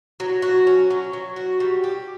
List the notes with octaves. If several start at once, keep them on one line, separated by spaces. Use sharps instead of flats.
F#3
F#4
C#4
F#3
F#3
F#4
G3
G4